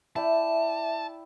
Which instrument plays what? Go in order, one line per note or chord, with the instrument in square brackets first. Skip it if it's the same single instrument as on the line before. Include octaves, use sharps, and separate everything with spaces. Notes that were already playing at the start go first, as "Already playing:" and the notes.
[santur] E4 D5 G5 [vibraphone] E5 [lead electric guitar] A5